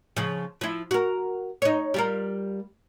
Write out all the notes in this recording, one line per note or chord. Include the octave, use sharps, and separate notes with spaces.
C#3 F3
F3 E4
F#4 A#4
D#4 C#5
G3 F4 A#4